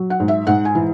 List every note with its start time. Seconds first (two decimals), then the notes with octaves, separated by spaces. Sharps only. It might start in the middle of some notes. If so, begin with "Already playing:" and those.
Already playing: F#3
0.10 F#5
0.20 G#2
0.28 E5
0.47 G#2 F#5
0.65 G#5
0.75 E3